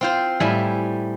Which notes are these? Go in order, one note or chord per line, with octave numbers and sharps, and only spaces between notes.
C4 F4 C5
A2 G3 E5 G#5